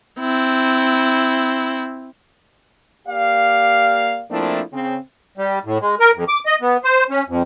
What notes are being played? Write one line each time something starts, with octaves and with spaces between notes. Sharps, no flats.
C4 E4
A#3 G4 D5 F5
F3 A3 A#3 C4 D4 E4
C#3 C4
G3
A2
G#3
A#4
F2
D6
D#5
B3
C5
C#4
F2